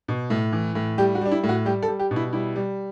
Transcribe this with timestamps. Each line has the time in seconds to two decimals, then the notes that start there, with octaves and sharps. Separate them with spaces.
0.08 B2
0.30 A2
0.53 E3
0.75 A2
0.98 G3 G4
1.15 F#4
1.21 G3 D4
1.32 E4
1.43 A2
1.49 F#4
1.65 G3 G4
1.83 A4
1.88 G3
1.99 G4
2.11 B2
2.16 E4
2.33 G3 E4
2.56 G3